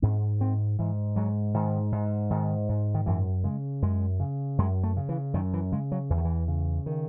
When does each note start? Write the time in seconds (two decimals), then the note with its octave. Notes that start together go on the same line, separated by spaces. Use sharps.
0.02 G#2 C4
0.40 G#2 C4
0.79 G#2 E3
1.16 G#2 F#3
1.54 G#2 D#3
1.92 G#2
2.30 G#2 D#3
2.69 G#2
2.94 D#3
3.06 F#2 E3
3.44 C#3 G#3
3.82 F#2 G#3
4.20 C#3
4.58 F#2 G#3
4.83 A3
4.97 C#3
5.09 E3
5.34 F#2 D#3
5.53 E3
5.72 C#3 G#3
5.92 F#3
6.10 E2 E3
6.18 D#3
6.25 E3
6.48 C#3
6.86 D#3